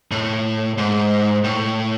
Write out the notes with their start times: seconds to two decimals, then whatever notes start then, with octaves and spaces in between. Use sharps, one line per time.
0.11 A2
0.78 G#2
1.44 A2